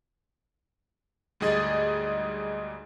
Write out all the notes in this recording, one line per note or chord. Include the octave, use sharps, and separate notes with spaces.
D2 G#2 G3 G#4 D#5 A6